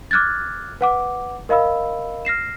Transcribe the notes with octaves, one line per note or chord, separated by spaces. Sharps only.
D6 F6 F#6 G#6 A6
B4 F#5 D6
A#4 D#5 F5 B5 E6
F6 A#6 C7 E7